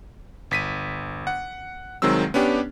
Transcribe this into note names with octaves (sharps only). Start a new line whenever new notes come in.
G1 B6 D#7
F#5
C2 D#3 F#3 G#3 C4 E6
B3 C#4 D4 G4